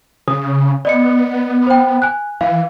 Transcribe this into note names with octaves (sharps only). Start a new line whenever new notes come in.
C#3 D#6
B3 D5 D#5 C#7
C5 G5
G#5 F#6
E3 F5